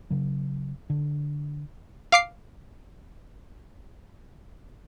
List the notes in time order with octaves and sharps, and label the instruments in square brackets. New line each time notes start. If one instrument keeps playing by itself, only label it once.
[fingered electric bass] C#3 F#3
D3
[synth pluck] F5 D6 C7